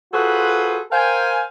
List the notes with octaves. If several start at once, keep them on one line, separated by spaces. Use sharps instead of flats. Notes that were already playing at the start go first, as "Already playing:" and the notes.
F4 F#4 G#4 A4 B4 C5
A#4 C5 F5 G5 G#5